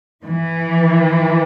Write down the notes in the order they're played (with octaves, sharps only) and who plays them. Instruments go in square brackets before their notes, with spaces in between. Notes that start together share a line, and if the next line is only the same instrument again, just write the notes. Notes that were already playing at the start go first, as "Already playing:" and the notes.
[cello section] E3